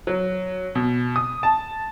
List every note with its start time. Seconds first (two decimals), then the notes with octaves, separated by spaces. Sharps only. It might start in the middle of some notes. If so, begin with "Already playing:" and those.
0.07 F#3
0.75 B2
1.16 D#6
1.43 A5